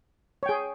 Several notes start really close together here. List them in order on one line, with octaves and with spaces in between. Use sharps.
C#5 G5 G#4